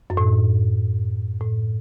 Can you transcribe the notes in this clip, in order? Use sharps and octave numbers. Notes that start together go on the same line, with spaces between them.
F#2
A2
A2